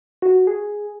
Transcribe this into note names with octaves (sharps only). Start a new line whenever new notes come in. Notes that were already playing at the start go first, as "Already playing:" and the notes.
F#4
G#4